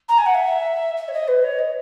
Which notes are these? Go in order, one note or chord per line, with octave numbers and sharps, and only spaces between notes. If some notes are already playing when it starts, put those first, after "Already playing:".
A#5
G#5
F#5
E5
E5
C#5
D#5
B4
C#5
D#5